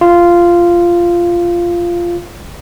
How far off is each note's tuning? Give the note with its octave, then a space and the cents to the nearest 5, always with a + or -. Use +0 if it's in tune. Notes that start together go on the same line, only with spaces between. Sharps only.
F4 -10